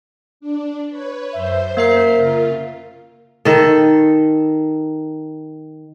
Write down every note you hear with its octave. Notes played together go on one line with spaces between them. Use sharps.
D4
B4 C#5
F#2 C5 E5 G6
A#3 A#4 E5 C7
C#3 F4
D#3 A4